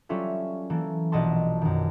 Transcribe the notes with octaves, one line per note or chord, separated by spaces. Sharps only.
F#3 G3 C#4 F4 A4 E5
E3 A#3 A4
A#1 B2 D#5 F#5 A5 C6
F#2 D#3